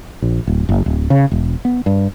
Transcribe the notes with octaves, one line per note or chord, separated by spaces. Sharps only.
A#1
D1
F#1
D1
C#3
E1
B3
G2